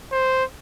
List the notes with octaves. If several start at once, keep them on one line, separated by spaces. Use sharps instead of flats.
C5